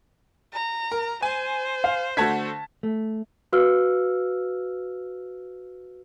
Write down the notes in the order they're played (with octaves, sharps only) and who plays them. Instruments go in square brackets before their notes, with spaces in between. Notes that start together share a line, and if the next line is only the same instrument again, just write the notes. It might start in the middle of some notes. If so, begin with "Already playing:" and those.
[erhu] A#5
[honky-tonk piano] A#4
[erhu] C5 [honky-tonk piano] G#5
[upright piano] F5
[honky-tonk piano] D3 A3 F#4 [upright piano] A5 G#6 B6
[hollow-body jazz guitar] A3
[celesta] F#4 B4 F5 E6 F6